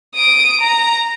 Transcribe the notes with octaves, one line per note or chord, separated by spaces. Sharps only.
D#6 D7
A#5